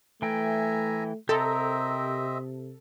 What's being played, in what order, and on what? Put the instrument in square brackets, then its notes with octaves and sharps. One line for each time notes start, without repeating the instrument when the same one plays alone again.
[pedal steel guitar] E3 G5 [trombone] A3 [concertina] E5 G#5 A#5
[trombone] C3 [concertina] C4 D#5 E5 [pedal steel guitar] G4 A#4 A#5 [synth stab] A4